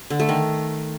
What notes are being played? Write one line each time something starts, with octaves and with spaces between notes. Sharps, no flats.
D3
A3
D#3